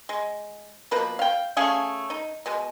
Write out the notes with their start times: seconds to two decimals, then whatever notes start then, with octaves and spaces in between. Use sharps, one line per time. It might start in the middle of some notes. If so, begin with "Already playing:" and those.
0.09 G#3
0.91 B2 F3 A#3 B4
1.19 F5 G5
1.57 A3 C#4 G#4 F5
2.10 D#4
2.46 B2 G#3